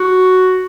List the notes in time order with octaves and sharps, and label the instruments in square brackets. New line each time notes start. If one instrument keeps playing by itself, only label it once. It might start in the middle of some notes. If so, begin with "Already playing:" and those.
Already playing: [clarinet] F#4